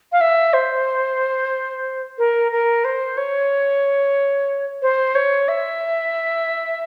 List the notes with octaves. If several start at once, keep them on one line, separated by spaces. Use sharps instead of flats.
F5
E5
C5
A#4
A#4
C5
C#5
C5
C#5
E5